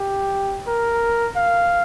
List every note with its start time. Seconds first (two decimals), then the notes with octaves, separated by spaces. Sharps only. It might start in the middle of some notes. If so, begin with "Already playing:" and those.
Already playing: G4
0.67 A#4
1.36 F5